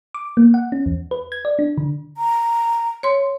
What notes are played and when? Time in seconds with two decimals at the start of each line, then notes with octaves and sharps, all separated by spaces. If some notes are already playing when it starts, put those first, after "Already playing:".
0.14 D6
0.37 A#3
0.54 F#5
0.72 C#4
0.86 E2
1.11 B4
1.32 G#6
1.45 D5
1.59 D4
1.78 D3
2.17 A#5
3.03 C#5 C6